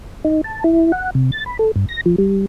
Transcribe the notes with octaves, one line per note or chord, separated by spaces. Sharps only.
D#4
A5
E4
F#5
C3
A6
B5
A4
G2
A#6
F3
G3